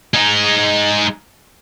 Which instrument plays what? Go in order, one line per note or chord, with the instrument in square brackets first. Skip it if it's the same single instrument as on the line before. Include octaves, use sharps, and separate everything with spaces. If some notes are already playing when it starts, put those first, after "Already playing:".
[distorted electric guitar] G#3 D#4